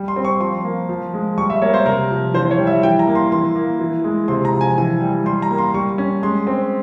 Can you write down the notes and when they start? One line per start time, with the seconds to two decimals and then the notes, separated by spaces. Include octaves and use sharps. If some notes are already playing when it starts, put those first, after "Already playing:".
Already playing: G3
0.08 C6
0.16 C4
0.25 C#6
0.40 F3 C6
0.64 A#3
0.89 F3
1.14 G#3
1.38 G3 C#6
1.50 E5
1.62 A#3 C#5
1.74 C5
1.85 C3 A#4
2.10 F3
2.34 E3 C5
2.51 C#5
2.59 G3
2.67 E5
2.83 E3 G5
2.99 A#5
3.07 A#3
3.15 C6
3.32 E3 C6
3.56 A#3
3.80 E3
4.04 G#3
4.28 C3 C6
4.45 A#5
4.53 F3
4.61 G#5
4.78 E3 G#5
5.01 G3
5.26 G3 C6
5.42 A#5
5.50 A#3
5.58 C6
5.74 G3 C#6
5.98 C#4
6.23 G#3 C6
6.47 C4